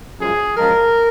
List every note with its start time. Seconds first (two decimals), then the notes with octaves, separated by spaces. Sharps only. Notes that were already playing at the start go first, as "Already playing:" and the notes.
0.19 F#2 F3 G#3 G#4
0.57 F#2 F3 G#3 A#4